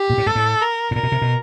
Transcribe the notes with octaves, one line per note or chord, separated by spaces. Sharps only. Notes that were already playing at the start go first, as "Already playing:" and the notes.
Already playing: G4
A#2
A2
G#2 A4
A2
A#4
A2
A#2 A#4
B2
C3
B2